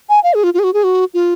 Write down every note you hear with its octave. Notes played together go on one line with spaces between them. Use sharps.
G#5
F5
G#4
F4
F4
G#4
F#4
G#4
F#4
F4